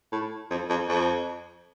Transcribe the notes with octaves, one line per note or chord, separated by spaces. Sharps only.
A2
F2
F2
F2